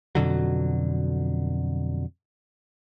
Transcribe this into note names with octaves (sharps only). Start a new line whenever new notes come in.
F2 B2 D3 F#3